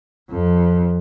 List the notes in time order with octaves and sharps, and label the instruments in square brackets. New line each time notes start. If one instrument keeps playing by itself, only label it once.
[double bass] F2